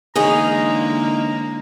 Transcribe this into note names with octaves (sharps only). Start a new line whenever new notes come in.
D3 E3 G#3 A#3 C#4 D#4 G#4 A#5